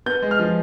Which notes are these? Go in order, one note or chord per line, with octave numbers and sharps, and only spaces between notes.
B3 G6
G#3
F6
F3